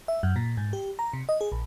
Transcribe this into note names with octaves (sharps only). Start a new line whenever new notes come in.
E5
F#2
A#2
G#2
G4
A#5
C3
D#5
G#4
A#1